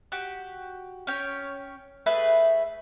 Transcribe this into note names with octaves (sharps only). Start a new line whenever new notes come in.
F#4 G4
C#4 C#5 G5
A3 G#4 B4 E5